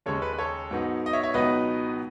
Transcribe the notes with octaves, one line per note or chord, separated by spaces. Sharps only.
D#2 C#3 G#3 C#4 A4 C#5
B4
B4
A4 C#5
G#2 F#3 B3 D#4
D#5
C#5 E5
C#5 E5
C#2 B2 F#3 B3 D#4 B4 D#5